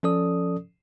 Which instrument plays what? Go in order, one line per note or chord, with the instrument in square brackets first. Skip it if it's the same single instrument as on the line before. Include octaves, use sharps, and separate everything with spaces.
[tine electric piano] F3 C#4 A4 D5 D#6